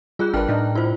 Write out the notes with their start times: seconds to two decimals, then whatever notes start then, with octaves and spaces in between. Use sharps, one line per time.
0.19 G3 F4 G#4 F#6
0.34 G#1 D4 A#4 B4 G5 F6
0.49 A2 D4 D#4
0.75 E4 F4 C5